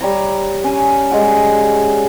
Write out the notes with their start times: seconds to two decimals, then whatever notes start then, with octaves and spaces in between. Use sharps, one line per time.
0.01 G3 C#5 A#5
0.64 C#4 G#5
1.11 G3 G#3 F#4